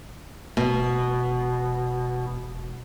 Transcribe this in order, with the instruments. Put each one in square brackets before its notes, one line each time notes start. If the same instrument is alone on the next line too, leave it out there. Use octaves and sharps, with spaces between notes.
[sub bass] E1 [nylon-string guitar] B2